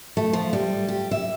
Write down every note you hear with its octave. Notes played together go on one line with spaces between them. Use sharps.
A3
F3
G3
G4
E5